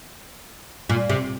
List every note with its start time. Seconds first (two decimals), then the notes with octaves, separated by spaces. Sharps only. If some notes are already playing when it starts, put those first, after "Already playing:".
0.90 A#2
1.09 C3